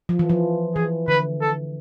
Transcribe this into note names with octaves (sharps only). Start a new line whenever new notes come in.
F3
E3
F3
E3 G#4
D3 B4
A4